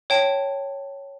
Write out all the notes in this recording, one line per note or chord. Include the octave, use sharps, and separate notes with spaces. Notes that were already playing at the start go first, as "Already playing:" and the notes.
C#5 G5 A5